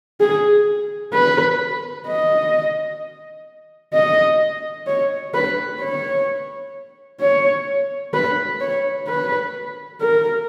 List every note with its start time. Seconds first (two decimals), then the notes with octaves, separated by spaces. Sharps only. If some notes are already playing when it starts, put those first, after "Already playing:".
0.21 G#4
1.14 B4
2.07 D#5
3.94 D#5
4.88 C#5
5.34 B4
5.81 C#5
7.21 C#5
8.14 B4
8.61 C#5
9.08 B4
10.01 A#4